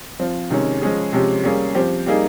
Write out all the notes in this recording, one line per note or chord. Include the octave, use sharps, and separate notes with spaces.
F3 C4 F4
C3 D#3 G#3 C#4
F3 G#3 C#4 G#4
C3 F3 G#3 C#4 G4
G3 A#3 C#4 G#4
F3 C4 G4
G3 A#3 D#4 G#4